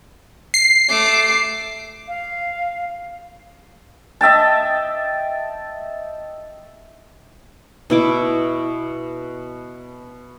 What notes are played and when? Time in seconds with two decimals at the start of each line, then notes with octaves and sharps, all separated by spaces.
0.54 C7
0.89 A3 D6
2.08 F5
4.21 D#5 E5 G5 A5
7.90 B2 E4 D6